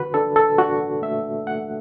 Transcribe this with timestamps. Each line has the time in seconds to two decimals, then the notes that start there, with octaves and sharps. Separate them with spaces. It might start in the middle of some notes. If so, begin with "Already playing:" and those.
Already playing: D3 F#4 B4
0.14 D4 A4
0.36 A4
0.58 D4 F#4
1.02 A3 E5
1.47 A3 F#5